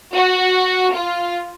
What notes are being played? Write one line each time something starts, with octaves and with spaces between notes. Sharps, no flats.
F#4
F4